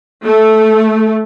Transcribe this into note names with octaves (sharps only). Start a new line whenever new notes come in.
A3